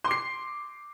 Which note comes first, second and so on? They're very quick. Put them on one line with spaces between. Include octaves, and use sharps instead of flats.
C6 D6 C7